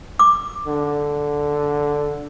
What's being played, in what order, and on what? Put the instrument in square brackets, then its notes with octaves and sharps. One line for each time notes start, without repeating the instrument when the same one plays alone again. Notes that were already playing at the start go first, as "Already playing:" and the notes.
[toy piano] D6
[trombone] D3